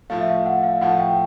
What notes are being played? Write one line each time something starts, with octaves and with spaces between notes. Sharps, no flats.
A2 F3 A3 F5
E5
F5
F#5
F5
A2 F3 A3 F#5
G5